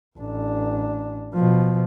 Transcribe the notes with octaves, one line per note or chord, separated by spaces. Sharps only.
A1 D4
B2 F3